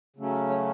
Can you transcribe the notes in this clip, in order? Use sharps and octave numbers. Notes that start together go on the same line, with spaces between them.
C#3 F#3 A3 C#4
C#5